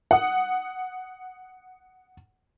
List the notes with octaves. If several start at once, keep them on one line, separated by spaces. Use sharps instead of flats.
F#5 D#6